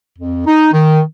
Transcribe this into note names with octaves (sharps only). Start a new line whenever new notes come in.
F2
D#4
D#3